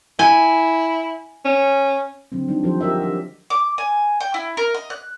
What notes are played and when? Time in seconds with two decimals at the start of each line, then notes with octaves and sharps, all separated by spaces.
0.19 E4 G#5
1.45 C#4
2.32 D3 F#3 C4
2.48 D#3 G3 D4 D#4
2.64 F3 F#3 G4 A4 C5
2.81 F#4 G4 A#4 D#5 E5
3.02 D4 G4
3.50 D6
3.78 G#5
4.21 G5
4.34 E4
4.57 A#4
4.74 D#5
4.90 F#6